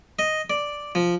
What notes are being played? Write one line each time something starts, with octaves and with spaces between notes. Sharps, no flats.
D#5
D5
F3